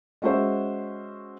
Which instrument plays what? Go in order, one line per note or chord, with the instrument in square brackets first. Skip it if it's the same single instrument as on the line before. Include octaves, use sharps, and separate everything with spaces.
[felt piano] G#3 C#4 F#4 G#4 C5 E5